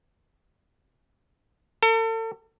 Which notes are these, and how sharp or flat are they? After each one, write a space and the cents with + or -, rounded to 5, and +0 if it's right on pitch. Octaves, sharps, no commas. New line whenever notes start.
A4 +40